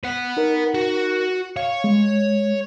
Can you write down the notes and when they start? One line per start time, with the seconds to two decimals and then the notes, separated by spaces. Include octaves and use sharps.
0.04 B4 F#5
0.37 D#4 A#4
0.75 F#4
1.56 C#5 F5
1.84 G#3